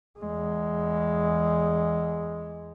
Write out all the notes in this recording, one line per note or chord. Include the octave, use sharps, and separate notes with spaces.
E2 G#3